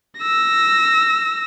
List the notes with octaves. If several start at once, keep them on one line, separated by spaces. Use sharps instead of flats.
E6 A#6